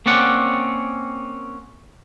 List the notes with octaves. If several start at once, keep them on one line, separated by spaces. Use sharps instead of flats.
A#3 C4 C#4 D5 F#5